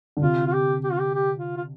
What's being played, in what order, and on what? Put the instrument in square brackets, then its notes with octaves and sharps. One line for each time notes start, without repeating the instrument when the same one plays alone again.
[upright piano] D3
[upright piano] C3 [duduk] F4
[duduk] F4
G4
G4
F4
G4
G4
F4
F4